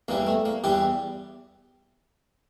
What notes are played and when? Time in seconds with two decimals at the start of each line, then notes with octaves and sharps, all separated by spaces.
0.08 E2 E3 G3 A#3
0.27 A3
0.45 A#3
0.64 E2 E3 G3 G4